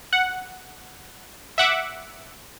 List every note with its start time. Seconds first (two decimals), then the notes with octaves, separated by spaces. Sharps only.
0.13 F#5
1.58 E5 F#5 D6